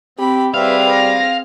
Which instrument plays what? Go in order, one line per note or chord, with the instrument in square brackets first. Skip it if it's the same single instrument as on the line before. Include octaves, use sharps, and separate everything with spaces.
[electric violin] C4 [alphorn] G4 [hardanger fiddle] B5
[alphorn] G3 [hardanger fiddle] C4 G#4 [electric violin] B4 E5 [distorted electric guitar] F5
[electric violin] A#6